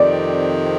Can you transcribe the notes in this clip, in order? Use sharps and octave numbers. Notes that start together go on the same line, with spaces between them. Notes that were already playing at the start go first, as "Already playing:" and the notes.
Already playing: F2 C3 D#3 D5